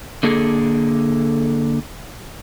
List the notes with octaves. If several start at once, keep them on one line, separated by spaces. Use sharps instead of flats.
D3 A#3 G#4 A4